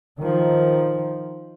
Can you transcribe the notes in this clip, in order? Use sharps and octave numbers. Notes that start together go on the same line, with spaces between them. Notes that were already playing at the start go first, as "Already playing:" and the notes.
D#3 F3